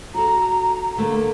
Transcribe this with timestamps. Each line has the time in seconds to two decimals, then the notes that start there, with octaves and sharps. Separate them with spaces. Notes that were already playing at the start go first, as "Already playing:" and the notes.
0.14 F#4 A4 A#5
0.97 D3 A3 A#3